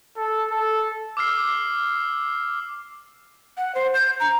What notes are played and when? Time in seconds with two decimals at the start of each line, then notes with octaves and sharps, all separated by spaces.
0.17 A4
0.51 A4
1.17 D6 E6 F6 C7
3.57 F#5
3.75 C5
3.94 G6
4.20 A#5